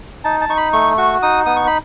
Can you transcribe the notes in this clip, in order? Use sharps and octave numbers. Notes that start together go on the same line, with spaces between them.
D#4 A5
A5
D#4 C#6
B5
A3 C#6
F#4 C#6
D#4 D#6
B3 D#6
C#6
B5